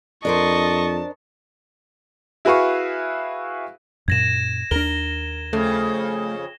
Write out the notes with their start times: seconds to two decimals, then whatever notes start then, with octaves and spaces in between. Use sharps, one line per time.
0.25 F2 D4 A#4 C5 D#5 A5 C#6
2.45 E4 F#4 G#4 B4 F5 C#6
4.08 F#2 A#2 G#6 A#6 E7
4.71 D#2 D4 A#4 G7
5.53 F2 C#3 A3